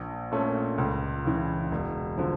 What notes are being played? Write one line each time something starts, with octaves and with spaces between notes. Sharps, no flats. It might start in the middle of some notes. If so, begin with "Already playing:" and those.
Already playing: A#1
A#2 A3 C#4
C#2
C#3 E3
E1
D3 F3